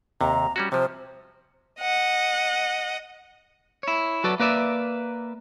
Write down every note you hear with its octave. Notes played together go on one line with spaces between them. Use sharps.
D#2 C3 A#5
G3 C#4 F#4
C3 F3 C5
D#5 F#5
E4 C#5
F#3 F#4 A4 B4 D5
A#3 B4 D5 E5